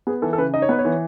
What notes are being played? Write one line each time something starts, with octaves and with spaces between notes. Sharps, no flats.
B3 G#4
E3 A4
A4
C#3 B4
D#4 D#5
C#5
B3 B4
C#5
E3